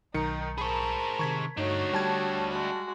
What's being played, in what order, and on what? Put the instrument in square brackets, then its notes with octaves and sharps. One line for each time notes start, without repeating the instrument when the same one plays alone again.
[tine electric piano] B1 [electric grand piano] D#3 C#7 [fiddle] D#4
[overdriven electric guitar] G#4 C5 [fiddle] A#4 A5 [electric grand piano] B5 C#6
[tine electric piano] C3 D#3 [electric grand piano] C#6 G#6 B6
[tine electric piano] G2 [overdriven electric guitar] A3 D4 [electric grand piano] D#4 [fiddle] F#4 C#5
[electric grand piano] G3 A5 G#6 [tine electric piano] G5
[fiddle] G#3 F#4